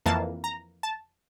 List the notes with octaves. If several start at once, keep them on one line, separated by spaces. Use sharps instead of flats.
F2 E3 A#3 A5
A#5
A5